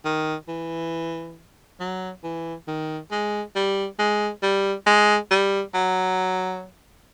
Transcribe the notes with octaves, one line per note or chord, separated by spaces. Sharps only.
D#3
E3
F#3
E3
D#3
G#3
G3
G#3
G3
G#3
G3
F#3